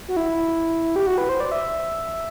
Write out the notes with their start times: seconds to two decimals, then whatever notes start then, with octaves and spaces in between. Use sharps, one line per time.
0.08 F#4
0.17 E4
0.96 G4
1.07 F#4
1.18 B4
1.29 C5
1.40 D5
1.52 E5